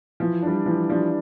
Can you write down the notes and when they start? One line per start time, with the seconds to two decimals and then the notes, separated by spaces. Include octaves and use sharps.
0.20 E3 F3
0.42 G3 D4
0.66 E3 F3
0.90 F3 G3 D4